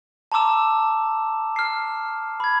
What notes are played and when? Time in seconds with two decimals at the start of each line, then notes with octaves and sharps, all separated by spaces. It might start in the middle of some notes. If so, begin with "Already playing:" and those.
0.32 A5 A#5 C6 D6 E6 E7
1.56 F6 C7
2.40 B5 G#6